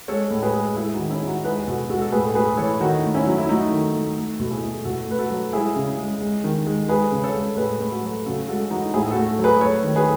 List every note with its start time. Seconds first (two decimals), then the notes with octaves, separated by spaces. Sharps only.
0.08 G#3 A4 C#5
0.31 A2
0.42 G#4 B4
0.54 G#3
0.76 G#3 E4 G#4
0.93 D#4 F#4
0.99 D#3
1.10 C#4 E4
1.22 G#3
1.27 D#4 F#4
1.44 G#3 G#4 B4
1.57 G#4
1.67 B2 F#4 A4
1.90 G#3 F#4 A4
2.02 A4
2.12 A2 G#4 B4
2.35 A3 G#4 B4
2.57 E3 A4 C#5
2.80 D#3 D#4 F#4
3.03 A3
3.14 C#4 E4
3.26 F#3
3.38 E4
3.49 A3 D#4 F#4
3.72 D#3
3.94 A3
4.17 A3
4.40 B2 A4
4.50 E4 G#4
4.62 A3
4.85 B2 F#4 A4
5.08 A3 B4
5.18 F#4 A4
5.30 F#3
5.53 G#3 E4 G#4
5.76 C#3
5.98 G#3
6.21 G#3
6.44 D#3
6.66 G#3
6.89 G#3 G#4 B4
7.11 C#3
7.23 A4 C#5
7.34 G#3
7.57 A2 G#4 B4
7.80 A3 B4
7.91 F#4 A4
8.03 F#3
8.26 C#3 F#4 A4
8.48 G#3 F#4 A4
8.70 E3 D#4 F#4
8.94 A2 E4 G#4
9.11 F#4 A4
9.16 A3
9.39 F#3
9.44 G#4 B4
9.61 A3 A4 C#5
9.84 D#3
9.96 G#4 B4